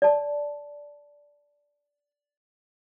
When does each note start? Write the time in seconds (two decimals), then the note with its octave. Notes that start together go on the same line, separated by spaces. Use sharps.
0.02 D5 A5